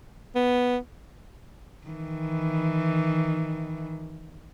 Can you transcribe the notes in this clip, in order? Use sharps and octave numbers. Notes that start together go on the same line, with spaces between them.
B3
D#3 E3